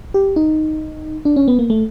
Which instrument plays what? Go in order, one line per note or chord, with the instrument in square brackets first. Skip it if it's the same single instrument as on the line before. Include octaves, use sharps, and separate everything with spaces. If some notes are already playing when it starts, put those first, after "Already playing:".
[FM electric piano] G4
D#4
D4
C#4
B3
A#3
A3